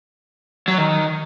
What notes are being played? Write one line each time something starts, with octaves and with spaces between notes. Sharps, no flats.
F#3
D#3